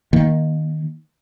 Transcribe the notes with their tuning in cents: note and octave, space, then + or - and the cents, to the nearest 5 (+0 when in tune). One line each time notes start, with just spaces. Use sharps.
D#3 +0 A#3 +20